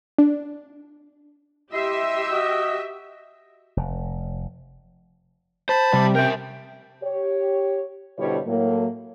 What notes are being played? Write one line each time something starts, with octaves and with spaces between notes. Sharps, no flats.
D4
E4 G4 D#5 E5 C6
F#4 D#5
F1
C5 A5 B5
C3 G3
A#4 E5 G5
G4 C#5
B2 D3 G3 E4 C5 C#5
A2 F#3 A#3